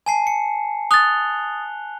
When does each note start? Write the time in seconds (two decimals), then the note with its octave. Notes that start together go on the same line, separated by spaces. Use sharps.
0.06 G#5 A5 C7
0.27 C#7
0.91 D#6 F#6 A6 F7 G7